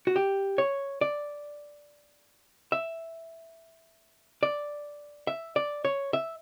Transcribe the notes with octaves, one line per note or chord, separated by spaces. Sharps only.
F#4
G4
C#5
D5
E5
D5
E5
D5
C#5
E5